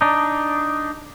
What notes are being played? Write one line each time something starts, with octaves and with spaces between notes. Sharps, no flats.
D4 D#4